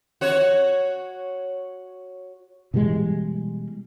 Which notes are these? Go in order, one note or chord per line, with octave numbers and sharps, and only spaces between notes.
F#4 C#5
B2 E3 G3 G#3